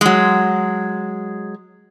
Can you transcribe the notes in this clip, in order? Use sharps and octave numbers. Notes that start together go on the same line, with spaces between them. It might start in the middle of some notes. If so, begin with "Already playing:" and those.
F#3 G#3